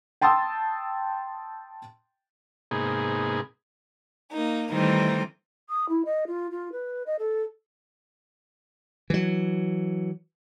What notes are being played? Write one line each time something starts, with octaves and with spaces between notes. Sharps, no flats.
G5 A5 C6 D#6 E6
G#2 C3 A#3 B3 D#4 G#4
A#3 D#4
D#3 E3 G3 A3 C4 D#4
D#6
E4
D#5
F4
F4
B4
D#5
A4
E3 F#3